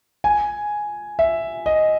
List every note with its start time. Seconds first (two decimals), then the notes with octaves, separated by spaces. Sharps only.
0.24 G#5
1.19 E5
1.66 D#5